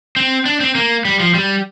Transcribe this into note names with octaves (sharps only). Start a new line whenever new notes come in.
C4
D4
C4
A#3
G3
F3
G3